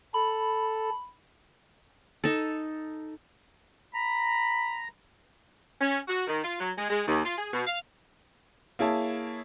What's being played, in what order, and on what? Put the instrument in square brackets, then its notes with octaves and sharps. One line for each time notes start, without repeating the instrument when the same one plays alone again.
[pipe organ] A4 [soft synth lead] B5
[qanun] D#4 A4
[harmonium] A#5 [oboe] B5
[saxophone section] C#4
F#4
D#3
F4
F#3
G#3
G#3
D#2
F4
G#4
B2
F5
[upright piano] A#3 E4 G#4 C#5 A5